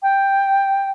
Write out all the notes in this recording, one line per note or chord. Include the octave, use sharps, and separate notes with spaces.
G5